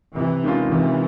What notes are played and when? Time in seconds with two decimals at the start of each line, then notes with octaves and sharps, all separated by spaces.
0.15 C3 E3
0.43 D#3 G#3 C#4 F4
0.71 C3 E3